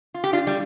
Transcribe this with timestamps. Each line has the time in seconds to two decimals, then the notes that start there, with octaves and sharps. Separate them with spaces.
0.14 F4
0.24 G4
0.33 D4 F4
0.47 G3